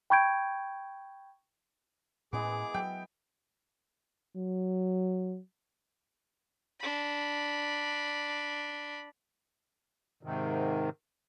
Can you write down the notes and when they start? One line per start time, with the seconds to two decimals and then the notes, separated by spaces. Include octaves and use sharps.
0.10 G5 B5 C#6 G6 G#6 D7
2.33 A2 E3 G#3 B3 C#4 G#4 D6
2.74 F#3 E5 G5
4.36 F#3
6.80 D4 B5
10.23 G#2 C3 D#3